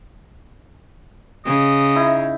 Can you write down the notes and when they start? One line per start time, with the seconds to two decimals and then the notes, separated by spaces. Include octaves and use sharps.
1.45 C#3 D#5
1.95 D#4 E4